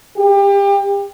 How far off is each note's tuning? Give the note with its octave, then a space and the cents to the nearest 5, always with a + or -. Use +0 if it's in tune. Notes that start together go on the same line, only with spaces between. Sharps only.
G4 +30